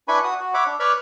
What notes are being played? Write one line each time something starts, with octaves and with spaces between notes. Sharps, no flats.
D4 E4 B4 G#5 B5 C#6
F#4 D#6
F#4
C#5 E5 F#5 B5 D6
D4
B4 C#5 D5 B5 C#6 F6